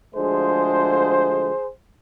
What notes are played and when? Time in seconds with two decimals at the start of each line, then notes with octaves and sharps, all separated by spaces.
0.15 D2 D3 F3 G#3 G#4 C5